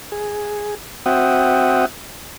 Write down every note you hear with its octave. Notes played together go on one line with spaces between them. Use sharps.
G#4
C4 F#4 E5 F#5 G5 D#6